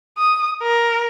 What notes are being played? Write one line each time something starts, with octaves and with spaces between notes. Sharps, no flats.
D#6
A#4